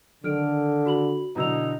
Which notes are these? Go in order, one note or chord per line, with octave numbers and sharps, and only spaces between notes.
D3 D#3 A4 F6 D7
F#4 B5 F#7
B2 D3 E3 D#4 A#5 E6 F7